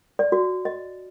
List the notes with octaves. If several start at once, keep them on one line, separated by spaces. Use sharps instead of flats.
D5
F#4
D#5